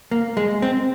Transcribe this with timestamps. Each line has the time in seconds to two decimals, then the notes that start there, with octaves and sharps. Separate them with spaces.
0.11 A#3
0.37 G#3
0.62 C4